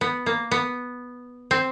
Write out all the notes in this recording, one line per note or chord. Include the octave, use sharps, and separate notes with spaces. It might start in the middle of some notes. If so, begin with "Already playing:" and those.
B3
A#3
B3
C4